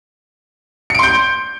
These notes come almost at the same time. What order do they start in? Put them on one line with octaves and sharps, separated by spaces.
C#7 D7 C6 G6